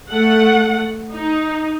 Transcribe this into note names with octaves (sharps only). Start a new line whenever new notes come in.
A3 F#5
D#4